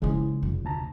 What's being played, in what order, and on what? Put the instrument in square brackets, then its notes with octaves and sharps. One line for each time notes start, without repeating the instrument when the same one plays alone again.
[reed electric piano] C#3 G#3 [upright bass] F3 E4
[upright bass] F1
[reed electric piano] D2 A5 A#5